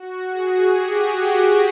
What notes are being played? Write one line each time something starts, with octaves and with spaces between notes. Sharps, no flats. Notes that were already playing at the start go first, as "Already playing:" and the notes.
Already playing: F#4
G#4
G4
F#4